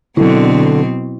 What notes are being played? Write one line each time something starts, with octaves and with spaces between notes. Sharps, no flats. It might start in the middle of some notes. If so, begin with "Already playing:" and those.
B2 D3 F#3 C4 E4